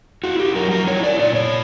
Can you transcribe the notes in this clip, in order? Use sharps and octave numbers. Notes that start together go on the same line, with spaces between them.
E4 F#4
G4
F#3 A#4
A#4
E4 C#5
D5
A#2 D5
C#5